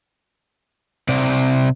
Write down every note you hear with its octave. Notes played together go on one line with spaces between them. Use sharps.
C3 D5